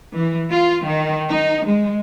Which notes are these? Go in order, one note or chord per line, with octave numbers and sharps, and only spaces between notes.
E3
F4
D#3
D#4
G#3